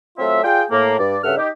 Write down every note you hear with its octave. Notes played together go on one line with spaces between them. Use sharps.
F#3 A3 C4 F4 E5
F4 G#4 D5 G5
A2 A#3
G2 D5
G2 C#3 A4 E5 F#5 F6
D#4 G4